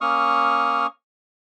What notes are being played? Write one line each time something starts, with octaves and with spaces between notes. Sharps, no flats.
A#3 C#4 C#6 D#6 F6